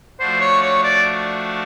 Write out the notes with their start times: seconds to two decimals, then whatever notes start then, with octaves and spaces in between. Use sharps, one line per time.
0.19 F3 A3 D4 F#4 C5
0.41 C#5
0.62 C#5
0.83 D5